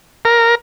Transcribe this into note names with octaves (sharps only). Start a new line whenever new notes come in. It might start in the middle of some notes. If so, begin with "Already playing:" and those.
A#4